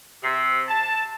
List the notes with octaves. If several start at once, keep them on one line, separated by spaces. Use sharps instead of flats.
C3
A5